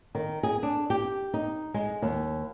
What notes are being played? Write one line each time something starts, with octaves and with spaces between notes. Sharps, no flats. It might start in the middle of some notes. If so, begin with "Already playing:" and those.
D#3
G#4
D4
G4
D#4
G#3
D#2